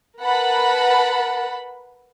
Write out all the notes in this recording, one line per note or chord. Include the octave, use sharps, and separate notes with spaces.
A#4 B4 F#5 A5 B5